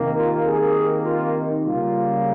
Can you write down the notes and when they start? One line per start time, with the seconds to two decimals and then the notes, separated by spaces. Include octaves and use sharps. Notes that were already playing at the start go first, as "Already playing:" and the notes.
Already playing: C3 D#3 A#3
0.16 F4
0.47 G#4
1.05 F4
1.35 D#4
1.64 C#3 G3 A#3 F4